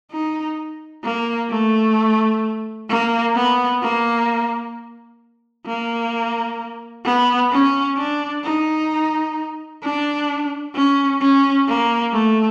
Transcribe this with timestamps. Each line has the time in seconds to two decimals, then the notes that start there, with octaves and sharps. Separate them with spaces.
0.12 D#4
1.04 A#3
1.50 A3
2.89 A#3
3.35 B3
3.82 A#3
5.66 A#3
7.05 B3
7.52 C#4
7.98 D4
8.44 D#4
9.83 D4
10.75 C#4
11.21 C#4
11.68 A#3
12.13 A3